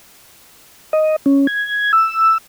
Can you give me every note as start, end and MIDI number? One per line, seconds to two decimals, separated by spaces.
0.93 1.16 75
1.26 1.47 61
1.47 1.92 92
1.93 2.38 88